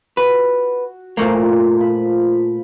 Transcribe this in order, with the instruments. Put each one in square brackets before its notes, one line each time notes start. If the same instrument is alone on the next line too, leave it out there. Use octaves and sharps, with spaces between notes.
[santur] F#4 [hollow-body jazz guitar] B4
[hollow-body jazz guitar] A#2 A3 A#3 [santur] F3 B5
[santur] F4 B5